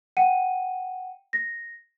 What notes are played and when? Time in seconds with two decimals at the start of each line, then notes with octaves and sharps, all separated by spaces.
0.17 F#5 G5 C#7 D#7
1.33 A#6